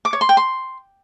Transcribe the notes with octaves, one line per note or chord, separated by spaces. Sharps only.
D6
C#5
C6
G5
C6